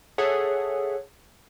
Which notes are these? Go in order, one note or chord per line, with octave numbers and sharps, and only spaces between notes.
G#4 A4 C#5 E5 F#5